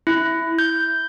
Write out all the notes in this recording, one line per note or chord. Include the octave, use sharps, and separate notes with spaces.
E4
G6